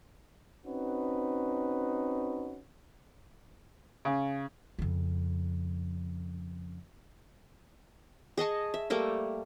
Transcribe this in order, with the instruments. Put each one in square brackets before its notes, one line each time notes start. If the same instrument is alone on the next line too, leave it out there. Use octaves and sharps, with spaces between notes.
[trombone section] C4 C#4 D#4 F#4 B4
[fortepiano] C#3
[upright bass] F2 C#3
[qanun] G#4 D#5 A5 C#6
E5
G3 A3 A#3 E5